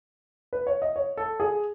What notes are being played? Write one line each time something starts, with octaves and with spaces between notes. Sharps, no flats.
B4
C#5
D#5
C#5
A4
G#4